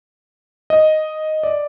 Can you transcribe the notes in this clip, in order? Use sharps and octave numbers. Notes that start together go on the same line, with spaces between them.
D#5
D5